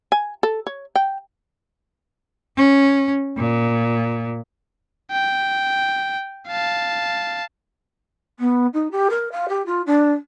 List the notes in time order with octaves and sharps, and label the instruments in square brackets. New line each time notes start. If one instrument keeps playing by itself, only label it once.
[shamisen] G#5
A4
C#5
G5
[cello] C#4
A#2
[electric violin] G5
F5 A5
[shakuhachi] B3
D#4
G4
A#4
F5
G4
F4
D4